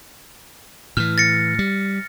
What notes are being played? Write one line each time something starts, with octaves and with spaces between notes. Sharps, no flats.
A2 E3 F6
A6 A#6 C#7
G3